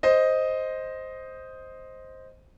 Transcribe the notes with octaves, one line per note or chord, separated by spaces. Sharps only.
C5 D#5